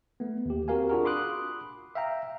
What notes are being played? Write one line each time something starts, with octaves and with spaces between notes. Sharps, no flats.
A3 B3
D#2 G4
C4 F#4 G4 A#4 F5 G#5
D4 F4 F#4 G#4 A#4
B5 C6 D6 D#6 F#6
E5 F5 G5 A#5